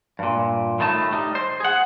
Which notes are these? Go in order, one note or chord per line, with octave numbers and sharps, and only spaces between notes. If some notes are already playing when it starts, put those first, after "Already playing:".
G2 A#2
A2 D#3 A3 A5
G3 D#4
C5
G#4 F#5